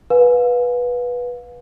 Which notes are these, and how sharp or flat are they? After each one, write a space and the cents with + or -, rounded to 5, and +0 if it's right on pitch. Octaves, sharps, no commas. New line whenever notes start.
B4 -10 F5 +35 G#5 +0